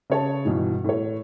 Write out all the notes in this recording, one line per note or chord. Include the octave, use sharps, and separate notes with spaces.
C#3 C#5 A5
G2 B2 D#3 E3
A2 C#5